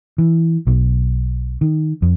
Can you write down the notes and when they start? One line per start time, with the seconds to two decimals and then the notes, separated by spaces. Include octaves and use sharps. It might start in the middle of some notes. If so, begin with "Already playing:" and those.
0.18 E3
0.67 B1
1.61 D#3
2.02 F2